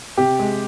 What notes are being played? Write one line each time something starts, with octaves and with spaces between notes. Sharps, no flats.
C3 G4
G#3